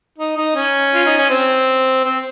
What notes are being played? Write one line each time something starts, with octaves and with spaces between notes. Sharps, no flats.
D#4
D#4
C#4
F4
D#4
C#4
C4
C4